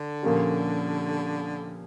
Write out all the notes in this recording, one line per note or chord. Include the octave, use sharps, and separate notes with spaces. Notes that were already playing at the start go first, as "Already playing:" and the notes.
Already playing: D3
A#2 F3 A#3 C#4 G4